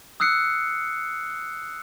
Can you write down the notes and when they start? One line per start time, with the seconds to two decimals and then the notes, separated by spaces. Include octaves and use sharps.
0.20 D#6 E6 F#6 C7 C#7